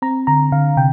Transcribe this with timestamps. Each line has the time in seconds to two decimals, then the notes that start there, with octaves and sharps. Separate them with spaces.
0.02 C4 A#5
0.27 D3 A#5
0.52 D3 F5
0.77 C3 G5